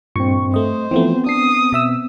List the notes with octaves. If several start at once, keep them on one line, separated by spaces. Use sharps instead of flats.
G2 A#2 C4 C#6
A3 C5 D#5
E3 F3 A3 B3 C4
D4 D#6 C7
B2 E5 E6